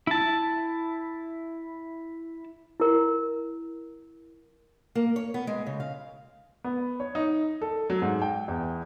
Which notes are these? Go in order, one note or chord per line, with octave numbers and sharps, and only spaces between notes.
E4 A5
E4 A#4
A#3
C#5
B3
G#3
C#3
F5
B3
C#5
D#4
A4
F#3
G#2
G5
E2